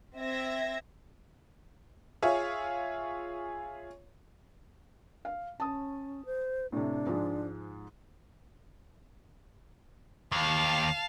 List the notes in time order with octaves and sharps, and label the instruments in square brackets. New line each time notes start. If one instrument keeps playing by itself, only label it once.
[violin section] C4 E5 G#6 A#6
[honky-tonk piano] F4 G#4 C#5 E5
[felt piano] F5
[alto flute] C#4 [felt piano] A5 D#6
[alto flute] C5
[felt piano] A2 C3 [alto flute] D4
[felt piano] G#2 F3 G#3
[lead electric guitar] D#2 [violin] F5 A5